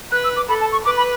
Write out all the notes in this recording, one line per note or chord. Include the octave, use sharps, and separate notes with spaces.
B4 F#6
E6
D6
A4 B5
A5
C#6
B4 D6
B5